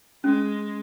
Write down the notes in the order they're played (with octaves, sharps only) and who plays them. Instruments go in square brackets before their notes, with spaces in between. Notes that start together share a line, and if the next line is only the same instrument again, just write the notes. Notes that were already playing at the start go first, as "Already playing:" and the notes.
[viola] G#3 [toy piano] C#4